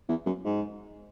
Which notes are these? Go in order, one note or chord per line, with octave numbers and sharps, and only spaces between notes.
E2
F#2
G#2